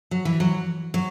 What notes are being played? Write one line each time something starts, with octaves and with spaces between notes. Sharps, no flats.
F#3
E3
F#3
F#3